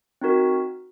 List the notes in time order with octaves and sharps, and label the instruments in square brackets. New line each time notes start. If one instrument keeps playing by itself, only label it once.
[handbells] C4 D#4 F#4 A#4